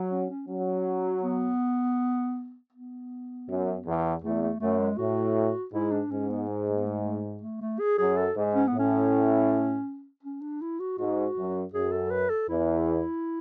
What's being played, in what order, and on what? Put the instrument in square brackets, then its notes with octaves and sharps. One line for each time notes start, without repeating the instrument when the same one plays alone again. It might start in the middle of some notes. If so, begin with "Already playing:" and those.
Already playing: [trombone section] F#3
[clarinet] C#4
C#4
[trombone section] F#3 [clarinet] C#4
[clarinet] B3
B3
[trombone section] F#2
E2
[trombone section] E2 [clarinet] A3
[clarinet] A3
[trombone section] F#2 [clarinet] A3
[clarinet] G#3
[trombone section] A2 [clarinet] F#4
[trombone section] G#2 [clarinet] E4
[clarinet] D4
[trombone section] G#2 [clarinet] C#4
[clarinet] B3
G#3
A3
B3
A3
A3
A3
A3
G#4
[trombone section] F#2 [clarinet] G#4
[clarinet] A4
[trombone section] G#2
[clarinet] C#4
B3
[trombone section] A2
[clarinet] C#4
C#4
D4
E4
F#4
[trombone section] G#2 [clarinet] F#4
[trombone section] F#2
[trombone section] F#2 [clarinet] G#4
[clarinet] A4
B4
A4
[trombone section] E2 [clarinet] E4